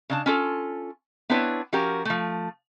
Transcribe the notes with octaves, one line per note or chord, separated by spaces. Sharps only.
C#3 D4 A5
C#4 F4 A4
B3 C4 D4 E4 B4 C#5
F3 C#4 F#4 G4 A#4
F3 A3